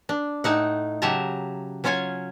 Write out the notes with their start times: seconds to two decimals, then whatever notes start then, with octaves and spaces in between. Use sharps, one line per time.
0.09 D4
0.44 A2 A3 D#4 F#5
1.02 C#3 F#3 G4 E5 A5 A#5
1.84 F#3 C#4 F4 C#5 G#5